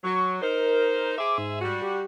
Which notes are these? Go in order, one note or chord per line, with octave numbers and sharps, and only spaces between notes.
F#3 C#6
D#4 A#4 C5
G#4 C5 E5 D6
G#2
G3 F#4
G4